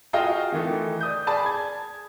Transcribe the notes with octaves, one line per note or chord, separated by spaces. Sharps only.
F4 F#4 G#4 D#5 F5 G5
D#3 E3 A3
D5 D#6 G6
G#4 D5 A5 B5
G#6